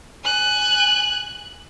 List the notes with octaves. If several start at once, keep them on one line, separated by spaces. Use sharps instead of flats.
G#5 F#6